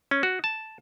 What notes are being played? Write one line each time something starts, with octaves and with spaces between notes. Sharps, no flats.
C#4
F#4
A5